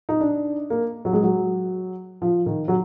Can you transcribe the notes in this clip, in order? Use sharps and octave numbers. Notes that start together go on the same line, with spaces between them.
D#4
D4
A#3
F#3
G#3
F#3
F3
D#3
F#3